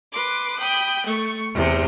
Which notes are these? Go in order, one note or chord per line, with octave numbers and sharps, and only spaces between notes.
B4 C6 D6
G5 B5 D#6
A3 C#6
E2 C3 C6